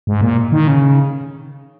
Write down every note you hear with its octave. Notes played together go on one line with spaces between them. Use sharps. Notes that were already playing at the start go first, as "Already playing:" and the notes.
G#2
A#2
D#3
C#3